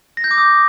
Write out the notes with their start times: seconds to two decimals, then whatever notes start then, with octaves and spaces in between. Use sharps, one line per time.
0.17 A#6
0.24 G6
0.31 D6
0.38 D#6